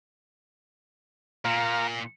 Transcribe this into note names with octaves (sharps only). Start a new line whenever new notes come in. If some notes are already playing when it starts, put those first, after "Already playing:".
A#2 F5 A#5